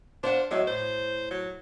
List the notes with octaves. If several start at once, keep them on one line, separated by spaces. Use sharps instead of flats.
D4 C5 F5 F#5
E2 A2 F#3 G#3
A2 C5
F#3